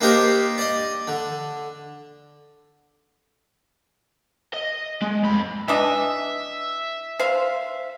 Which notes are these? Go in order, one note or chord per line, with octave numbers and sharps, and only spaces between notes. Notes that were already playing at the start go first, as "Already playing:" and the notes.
A#3 D4 D#4 G4 A#4 C5
D5 D#5
D3
D#5
G#3
F2 B5
E3 D4 D#5 E5
C5 F5